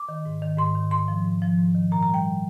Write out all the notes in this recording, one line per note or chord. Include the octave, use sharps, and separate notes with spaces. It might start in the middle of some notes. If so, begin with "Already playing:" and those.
Already playing: D6
D#3
G#2
D#3
G#2 C6
D#3
G#2 C6
F3
G#2
F3
G#2
D#3
A#2 A#5
A#5
G3
G5